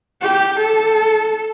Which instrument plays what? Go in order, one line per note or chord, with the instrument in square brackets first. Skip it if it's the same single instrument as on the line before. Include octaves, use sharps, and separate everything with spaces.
[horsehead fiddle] G4
A4